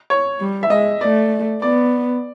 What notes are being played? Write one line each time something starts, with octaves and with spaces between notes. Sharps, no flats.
C#5
G3
E5
G#3 D#5
A3 D5
B3 D5